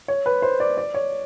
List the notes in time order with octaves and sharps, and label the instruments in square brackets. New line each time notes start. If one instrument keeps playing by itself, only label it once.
[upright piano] C#5
B4
C5
D5
D5
C#5